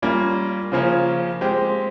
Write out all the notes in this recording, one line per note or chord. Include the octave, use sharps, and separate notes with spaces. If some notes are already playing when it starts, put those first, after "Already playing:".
G3 A#3 C#4 F4
C#3 F3 A#3 C#4
G#3 C4 G4